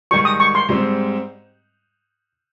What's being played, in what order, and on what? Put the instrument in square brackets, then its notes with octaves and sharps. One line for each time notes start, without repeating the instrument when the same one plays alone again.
[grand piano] G#2 D#3 G3 [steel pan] C#6
[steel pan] D#6
C#6
C6
[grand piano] G#2 G3 C4